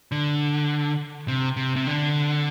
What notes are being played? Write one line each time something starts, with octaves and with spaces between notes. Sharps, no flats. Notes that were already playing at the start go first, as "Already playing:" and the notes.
D3
C3
C3
C3
D3